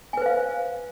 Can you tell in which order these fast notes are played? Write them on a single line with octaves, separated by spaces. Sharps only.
G#5 B4 C5 F5